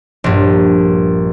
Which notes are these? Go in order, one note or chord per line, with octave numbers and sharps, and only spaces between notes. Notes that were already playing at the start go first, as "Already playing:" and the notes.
A#1 G2